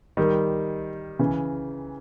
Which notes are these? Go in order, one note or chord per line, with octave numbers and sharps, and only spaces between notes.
D#3 G3
C#3 E3